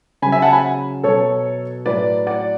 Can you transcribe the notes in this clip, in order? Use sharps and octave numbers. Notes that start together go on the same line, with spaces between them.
C#3 F#3 G#5 B5
E5 G#5
F#5 A5
G#5 B5
B2 F#3 A4 C#5
A2 F#3 B4 D5
D5 F#5